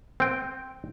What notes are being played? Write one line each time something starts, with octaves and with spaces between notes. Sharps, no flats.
C4 G5